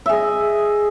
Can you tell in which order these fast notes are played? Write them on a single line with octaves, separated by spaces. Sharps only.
E5 G#4 D#5